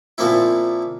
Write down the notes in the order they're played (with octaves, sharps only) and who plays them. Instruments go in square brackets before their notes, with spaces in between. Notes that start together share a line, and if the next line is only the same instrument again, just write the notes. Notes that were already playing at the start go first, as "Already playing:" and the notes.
[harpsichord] A#2 F3 A#3 C4 E4